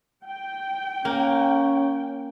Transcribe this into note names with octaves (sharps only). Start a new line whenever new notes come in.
G5
A#3 C#4